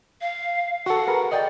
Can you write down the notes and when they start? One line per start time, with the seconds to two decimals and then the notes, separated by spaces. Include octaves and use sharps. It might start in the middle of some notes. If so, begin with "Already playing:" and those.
0.21 F5
0.86 F#4 A4 F#5
1.07 G#4 A#4 B4
1.32 D5 D#5 G5